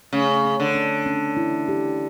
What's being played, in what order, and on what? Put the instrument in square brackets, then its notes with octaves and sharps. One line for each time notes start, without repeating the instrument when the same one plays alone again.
[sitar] C#3 [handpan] A3
[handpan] C#4
[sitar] D3
[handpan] C#4
C#4
E4
G4